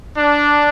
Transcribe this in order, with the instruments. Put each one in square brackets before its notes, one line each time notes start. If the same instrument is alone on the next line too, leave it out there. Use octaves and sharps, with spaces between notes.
[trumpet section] D4